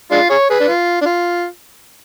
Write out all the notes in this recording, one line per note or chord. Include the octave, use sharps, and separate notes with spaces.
G#3 D4 F4
G#4 C#5
G#4 B4
D4
F4
D4
F4